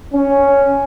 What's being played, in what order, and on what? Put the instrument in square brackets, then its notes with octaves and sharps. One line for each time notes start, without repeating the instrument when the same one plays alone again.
[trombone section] C#4